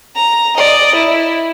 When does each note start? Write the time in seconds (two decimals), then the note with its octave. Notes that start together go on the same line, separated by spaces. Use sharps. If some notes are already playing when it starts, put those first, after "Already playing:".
0.16 A#5
0.57 D5 D#5
0.96 E4